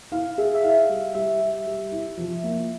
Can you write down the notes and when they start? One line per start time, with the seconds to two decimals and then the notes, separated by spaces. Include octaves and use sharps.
0.12 E4 F5
0.38 G#4 E5
0.54 E5
0.63 E4 F5
0.89 G3
1.14 G3 E5
1.41 G3
1.66 G3
1.92 E4
2.17 F3
2.44 A#3